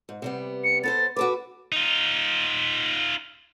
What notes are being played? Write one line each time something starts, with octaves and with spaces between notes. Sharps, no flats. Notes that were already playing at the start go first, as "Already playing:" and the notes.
G#2
C3 G3 B3
C#7
B3 A4 C5 A6
F#4 A4 B4 D6
D#4 F4